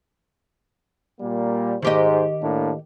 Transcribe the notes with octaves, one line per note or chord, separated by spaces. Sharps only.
A#2 G3 A#3
G#2 D#3 G4 C5 D#5
A2 A#3 D4